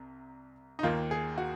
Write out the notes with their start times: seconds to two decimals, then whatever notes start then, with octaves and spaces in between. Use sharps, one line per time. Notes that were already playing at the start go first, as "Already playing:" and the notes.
Already playing: C2 C3
0.79 D#4
0.83 D#2 D#3 A#3 F4
1.11 G#4
1.38 F#4